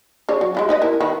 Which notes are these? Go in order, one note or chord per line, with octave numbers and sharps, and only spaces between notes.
D4 G#4 C#5
F#3
G#3 E4 F4
D#4 B4 D#5
E4 A#4
D#3 B4